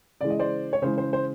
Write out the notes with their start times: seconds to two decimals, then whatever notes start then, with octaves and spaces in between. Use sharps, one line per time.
0.21 C#3 E3 G#3 D5
0.30 D#5
0.39 C5 D5
0.73 C#5
0.82 C#3 E3 G#3 C5
0.98 C5
1.13 C5